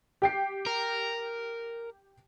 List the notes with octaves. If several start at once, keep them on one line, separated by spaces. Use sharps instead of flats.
G4 G5 C7
A#4